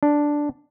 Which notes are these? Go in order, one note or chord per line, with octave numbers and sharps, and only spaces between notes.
D4